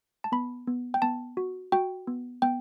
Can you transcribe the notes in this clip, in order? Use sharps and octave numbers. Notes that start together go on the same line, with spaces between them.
A5
B3 B5
B3
G5
B3 A5
F#4
F#4 G5
B3
B3 G5